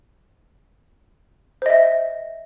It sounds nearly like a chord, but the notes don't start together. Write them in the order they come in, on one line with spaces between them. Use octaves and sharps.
C5 D#5 E5